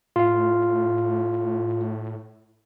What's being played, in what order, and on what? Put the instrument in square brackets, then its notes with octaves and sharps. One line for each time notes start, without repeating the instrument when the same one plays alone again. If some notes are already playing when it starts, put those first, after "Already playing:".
[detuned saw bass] A2 [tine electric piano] F4 F5